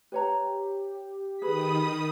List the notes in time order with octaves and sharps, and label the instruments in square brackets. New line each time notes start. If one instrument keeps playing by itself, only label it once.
[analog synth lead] G4 [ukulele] B4 C#5 A#5
[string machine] D#3 D#6 [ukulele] G#4 B4 [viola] B5